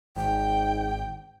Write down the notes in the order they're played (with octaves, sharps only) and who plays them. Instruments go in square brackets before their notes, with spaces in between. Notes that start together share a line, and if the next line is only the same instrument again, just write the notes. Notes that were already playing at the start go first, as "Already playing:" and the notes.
[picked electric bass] G#1 [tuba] G#2 [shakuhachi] G5